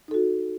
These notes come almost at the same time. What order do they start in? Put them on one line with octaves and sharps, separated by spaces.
D#4 A4 F#4